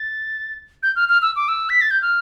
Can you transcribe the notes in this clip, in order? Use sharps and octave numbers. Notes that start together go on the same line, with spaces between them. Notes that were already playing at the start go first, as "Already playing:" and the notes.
Already playing: A6
G6
F6
F6
E6
D6
E6
B6
A6
G6
F6